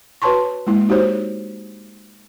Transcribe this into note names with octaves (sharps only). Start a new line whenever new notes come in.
F#4 B4 C#5 A5 C6 C#6
G#3 A#3 E4
D#4 F#4 G4 C5 C#5